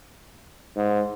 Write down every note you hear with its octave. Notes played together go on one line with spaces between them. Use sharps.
G#2